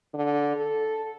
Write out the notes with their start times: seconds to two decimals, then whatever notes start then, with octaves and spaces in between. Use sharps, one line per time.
0.14 D3
0.57 A4